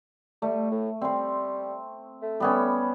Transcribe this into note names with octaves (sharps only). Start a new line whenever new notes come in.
G3 A3
A2
G3 C4 C6
A3
G3 B3 C#4